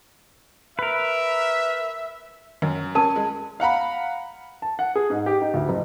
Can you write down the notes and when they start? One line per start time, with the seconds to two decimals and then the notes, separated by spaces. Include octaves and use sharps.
0.79 A#4 B4 E5
2.62 F#2 D#3
2.95 C#4 A#4 A5
3.16 G#3
3.60 F5 F#5 A#5 B5
4.62 A5
4.79 F#5
4.95 G#4
5.10 G#2
5.26 G4
5.42 D#4
5.54 D2
5.69 F#1